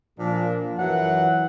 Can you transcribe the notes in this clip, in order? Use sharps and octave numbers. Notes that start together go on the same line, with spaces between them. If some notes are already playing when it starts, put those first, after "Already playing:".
A#2 F3 A#3 D4
F#2 E3 F#3 F#5